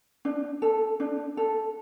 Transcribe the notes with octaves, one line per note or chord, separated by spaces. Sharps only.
D4
A4
D4
A4